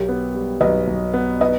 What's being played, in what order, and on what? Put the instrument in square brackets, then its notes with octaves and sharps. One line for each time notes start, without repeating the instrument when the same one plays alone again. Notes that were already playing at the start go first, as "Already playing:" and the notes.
Already playing: [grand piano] B1 [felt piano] G4 A#4
[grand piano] B3
G3
[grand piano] B1 [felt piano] B4 D#5
[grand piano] B1
B3
[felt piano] B4 D#5